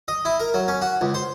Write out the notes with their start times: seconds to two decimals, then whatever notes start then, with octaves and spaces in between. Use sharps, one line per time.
0.08 D#5
0.25 E4
0.40 A#4
0.54 F#3
0.68 C#4
0.81 F#4
1.01 C#2
1.14 C5